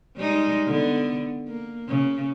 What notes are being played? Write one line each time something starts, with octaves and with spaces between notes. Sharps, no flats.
G3 G#3 D#4
D3 B3
A#3
C#3